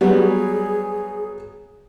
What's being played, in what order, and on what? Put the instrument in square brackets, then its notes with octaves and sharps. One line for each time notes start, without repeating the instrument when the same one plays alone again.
[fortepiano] F#3 G3 B3 [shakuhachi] G#4